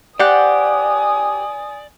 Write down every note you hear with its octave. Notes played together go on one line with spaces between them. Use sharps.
G4 C5 D5 F#5 G#5 D#6